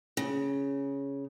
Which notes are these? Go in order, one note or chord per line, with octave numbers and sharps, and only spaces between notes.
C#3